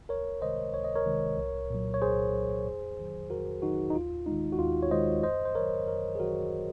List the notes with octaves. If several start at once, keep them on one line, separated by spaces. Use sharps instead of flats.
C#2 A#4 C#5
C3 D#3 G#3 C5 D#5
C#2 C#5
D#5
A#4 C#5
C3 D#3 G#3
C2
A#2 F#3
C#5
C2 G#4 C5
A#2 F#3
F2
D#3 F#3
F2 F#4 A#4
D#3 F#3 D#4 F#4
D#4
D#2 F4
D#3 G#3 D#4
F#4
D#2 F4
C#5
D#3 G#3 C5 D#5
F#2 C5 D#5
C5
D#3 F#3 A#4 C#5
C5
F#2 A#4 C#5
G#4
D#3 F#3 F#4 A#4